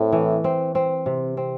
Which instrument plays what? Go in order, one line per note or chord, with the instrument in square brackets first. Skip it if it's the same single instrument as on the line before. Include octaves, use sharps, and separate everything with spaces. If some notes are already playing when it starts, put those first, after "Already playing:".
Already playing: [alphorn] A2 [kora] C4
[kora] E3
C4
C4
C3
C4